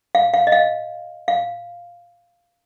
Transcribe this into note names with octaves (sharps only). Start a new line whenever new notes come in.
F5
F5
D#5
F5
F5